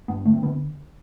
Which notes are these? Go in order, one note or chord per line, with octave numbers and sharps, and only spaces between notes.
G2 B3
D3 A3
C4
D3 B3